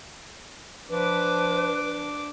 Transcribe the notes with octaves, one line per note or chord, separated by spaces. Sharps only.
F3 D4 B4 D6